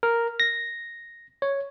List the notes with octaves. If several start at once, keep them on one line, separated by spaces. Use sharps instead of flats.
A#4
A#6
C#5